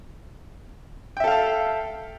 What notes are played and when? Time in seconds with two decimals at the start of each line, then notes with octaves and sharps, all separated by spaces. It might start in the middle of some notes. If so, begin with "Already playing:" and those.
1.17 G5
1.20 E5
1.24 A4
1.27 F5
1.31 A5